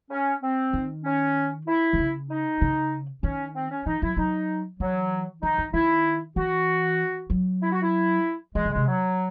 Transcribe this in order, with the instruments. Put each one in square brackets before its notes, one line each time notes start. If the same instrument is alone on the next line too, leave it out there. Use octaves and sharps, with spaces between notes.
[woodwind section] C#4
C4
[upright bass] D#3
[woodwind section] C#4
E4
[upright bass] D#3
C#3
[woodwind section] D#4
[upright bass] C#3
[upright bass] D#3 [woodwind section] C#4
[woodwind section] C4
C#4
[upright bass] E3 [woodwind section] D#4
[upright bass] F#3 [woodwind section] E4
[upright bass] F#3 [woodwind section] D#4
[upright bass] E3 [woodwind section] F#3
[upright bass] E3 [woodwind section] D#4
[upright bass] E3
[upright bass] D#3 [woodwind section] E4
[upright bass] E3 [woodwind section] F#4
[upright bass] F#3
[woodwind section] E4
F#4
E4
[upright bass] E3 [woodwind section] G#3
[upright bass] C#3
[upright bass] C3 [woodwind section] G#3
[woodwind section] F#3